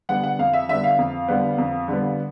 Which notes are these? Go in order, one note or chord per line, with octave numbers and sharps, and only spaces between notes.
D3 G3 B3 F#5
F#5
F2 F5
E5
D3 G3 B3 E5
F5
F2
D3 G3 B3
F2
D3 G3 B3